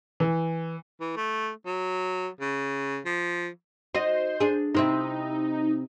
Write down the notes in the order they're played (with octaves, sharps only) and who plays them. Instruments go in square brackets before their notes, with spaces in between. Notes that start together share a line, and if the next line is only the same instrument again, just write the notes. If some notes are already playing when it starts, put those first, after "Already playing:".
[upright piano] E3
[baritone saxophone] E3
A3
F#3
C#3
F3
[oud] D#4 F#4 D#5 [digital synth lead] C5
[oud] D4 G#4
[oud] C3 C4 E4 [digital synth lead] D#4